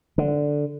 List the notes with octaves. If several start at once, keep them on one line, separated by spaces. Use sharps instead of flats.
D3